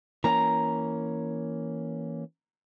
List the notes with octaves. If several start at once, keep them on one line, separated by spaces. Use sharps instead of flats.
E3 A#3 C#4 A#5